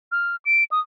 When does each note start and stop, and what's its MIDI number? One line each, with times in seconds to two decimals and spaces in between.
0.12 0.36 89
0.45 0.64 98
0.71 0.80 87